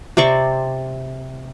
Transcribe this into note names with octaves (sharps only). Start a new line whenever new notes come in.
C3 C4 D5 C#6